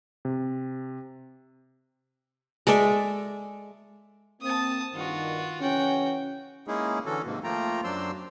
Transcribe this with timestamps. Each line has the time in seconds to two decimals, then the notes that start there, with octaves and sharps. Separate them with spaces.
0.25 C3
2.67 G#3 A4 D5 E5
4.41 A#3 C4 A5 D#6
4.95 G2 D#3 F4 F#4
5.61 C#3 E3 C#4 F#4 G5
6.67 G#3 A#3 C#4 D#4 E4 G#4
7.06 D3 E3 C#4 F#4 A4
7.26 G#2 C3 D#3 A#3
7.44 F3 A3 A#3 F4 G5 A#5
7.84 F#2 F#3 D4 C5 C6 E6